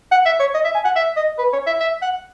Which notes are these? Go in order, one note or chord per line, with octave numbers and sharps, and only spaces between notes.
F#5
E5
C#5
D#5
E5
G#5
F#5
E5
D#5
B4
C#5
E5
E5
F#5